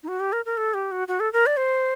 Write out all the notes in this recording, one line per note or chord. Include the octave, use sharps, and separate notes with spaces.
D#4
F#4
G4
A#4
A#4
A4
G4
F#4
F#4
A4
A#4
D5
C5